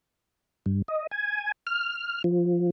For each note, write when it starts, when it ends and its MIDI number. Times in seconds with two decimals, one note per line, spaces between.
0.66 0.82 43
0.88 1.07 75
1.11 1.52 80
1.67 2.23 89
2.24 2.70 53